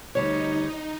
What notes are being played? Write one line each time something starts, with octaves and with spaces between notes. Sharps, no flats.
D2 G3 D#4 C#5